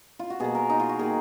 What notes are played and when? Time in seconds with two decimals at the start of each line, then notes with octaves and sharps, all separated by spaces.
0.19 F4
0.30 F#4
0.40 B2 A#3 G#4
0.55 A#4
0.70 D#4
0.80 F4
0.89 F#4
0.99 D#3 A#3 G#4